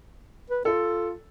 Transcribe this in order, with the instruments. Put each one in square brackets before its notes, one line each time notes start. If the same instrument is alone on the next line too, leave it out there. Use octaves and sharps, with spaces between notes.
[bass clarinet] B4
[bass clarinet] F4 [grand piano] A4